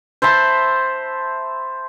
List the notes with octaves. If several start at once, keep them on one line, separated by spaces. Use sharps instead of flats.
C5 E5 A5 B5